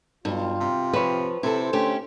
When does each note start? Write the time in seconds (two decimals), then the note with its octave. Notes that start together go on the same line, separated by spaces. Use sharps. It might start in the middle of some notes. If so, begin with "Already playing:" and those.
0.25 B1 G2 F4 G5
0.61 C3
0.93 F3 B4 C#5
1.43 C3 E4 A4 C5
1.73 D3 A3 C#4 G4